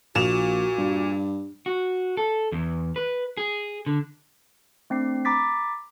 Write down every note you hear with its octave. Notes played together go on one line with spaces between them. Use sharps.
A#1 A#2 F#4 E7 F7
G2
F#4
A4
E2
B4
G#4
D3
A3 C4 D4 C7
A#5 B5 D6 A6 B6